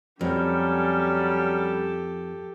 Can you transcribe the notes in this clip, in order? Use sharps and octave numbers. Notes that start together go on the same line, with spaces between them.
F2 F#3 G3 C#4 G4 A4